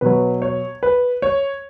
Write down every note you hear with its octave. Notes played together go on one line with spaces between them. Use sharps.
B2 F#3 B4
C#5
B4
C#5